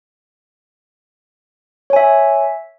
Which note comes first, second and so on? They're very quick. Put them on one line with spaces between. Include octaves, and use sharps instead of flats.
C#5 G#5 E5